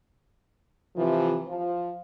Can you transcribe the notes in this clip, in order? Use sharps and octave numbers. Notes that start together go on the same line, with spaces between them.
C3 E3 F3
F3